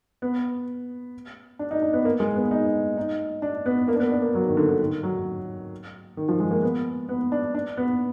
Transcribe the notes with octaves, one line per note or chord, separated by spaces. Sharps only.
B3
D4
D#4
D4
B3
A#3
G#3
B3
D#4
D#4
D4
B3
A#3
D4
B3
D4
A#3
F#3
D#3
D3
D3
D#3
F#3
D#3
F3
G#3
A#3
B3
B3
D4
D4
B3